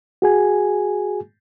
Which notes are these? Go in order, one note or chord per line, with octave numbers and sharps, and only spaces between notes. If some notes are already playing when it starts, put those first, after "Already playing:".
F#4 G#4 G#5